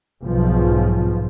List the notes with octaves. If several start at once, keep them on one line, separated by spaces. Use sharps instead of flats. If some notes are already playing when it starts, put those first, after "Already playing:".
B1 G#2 B2 F3